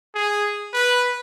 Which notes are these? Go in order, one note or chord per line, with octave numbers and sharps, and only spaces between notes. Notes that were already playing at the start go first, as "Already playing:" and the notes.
G#4
B4